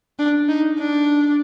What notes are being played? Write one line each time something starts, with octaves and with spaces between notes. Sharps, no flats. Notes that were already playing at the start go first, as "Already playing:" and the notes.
D4
D#4
D4